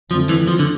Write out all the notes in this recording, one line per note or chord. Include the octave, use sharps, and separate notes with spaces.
F2 D3 F3 A3 C4
E3
F3
D3